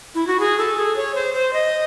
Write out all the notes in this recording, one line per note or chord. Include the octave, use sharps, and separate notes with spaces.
E4
F#4
G#4
A4
G#4
C#5
C5
C5
D#5